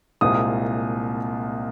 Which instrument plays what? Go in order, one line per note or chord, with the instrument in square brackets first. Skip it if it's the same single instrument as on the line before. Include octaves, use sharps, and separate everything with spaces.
[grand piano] C2 A#2 G#3 C4 D#6